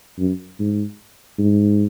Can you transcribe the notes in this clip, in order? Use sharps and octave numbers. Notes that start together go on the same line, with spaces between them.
F#2
G#2
G#2